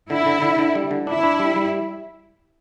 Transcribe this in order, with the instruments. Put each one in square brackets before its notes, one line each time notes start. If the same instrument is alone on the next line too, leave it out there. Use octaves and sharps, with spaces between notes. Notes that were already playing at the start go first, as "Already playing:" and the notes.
[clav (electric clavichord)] D3 [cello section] E4
[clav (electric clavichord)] D3
D3
D3
G3
D3
[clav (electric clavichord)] D4 [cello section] E4
[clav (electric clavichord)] D4
G3
G3